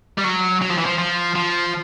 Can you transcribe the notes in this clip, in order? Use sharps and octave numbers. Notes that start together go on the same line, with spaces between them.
G3
F#3
F#3
F3
E3
F3
F3
F3